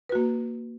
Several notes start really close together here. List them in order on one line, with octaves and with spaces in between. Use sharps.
B4 F#4 A#3